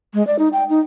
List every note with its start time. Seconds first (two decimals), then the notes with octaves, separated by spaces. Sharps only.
0.14 G#3
0.27 D5
0.39 D#4
0.53 G5
0.69 D#4